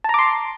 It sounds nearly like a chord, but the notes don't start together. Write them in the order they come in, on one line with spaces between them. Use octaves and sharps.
A5 A#5 D6 C6